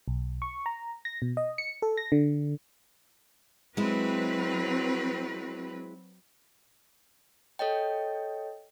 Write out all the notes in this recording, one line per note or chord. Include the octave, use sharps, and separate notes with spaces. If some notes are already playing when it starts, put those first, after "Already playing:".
B1
C#6
A#5
A#6
B2
D#5
C#7
A4
A#6
D3
F#3 G#3 C4 E4 B4
A4 C#5 D#5 G5